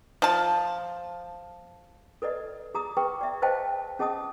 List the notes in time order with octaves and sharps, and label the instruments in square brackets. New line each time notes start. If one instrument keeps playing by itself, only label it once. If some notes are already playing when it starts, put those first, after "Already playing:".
[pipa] F3 A5
[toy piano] A4 B4 D5 D#5
G#4 A#5 D#6
G#4 B4 G5 C#6
D5 E5
B4 C5 D#5 F5 G5 A5
C#4 G#4 D#5 A5 D#6